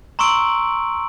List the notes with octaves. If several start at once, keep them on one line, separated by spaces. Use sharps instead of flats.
A#5 C6 C#6 E6 D7 F#7